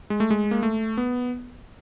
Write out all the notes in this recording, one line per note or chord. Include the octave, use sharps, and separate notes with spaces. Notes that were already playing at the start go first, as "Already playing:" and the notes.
G#3
A3
G#3
A#3
A3
B3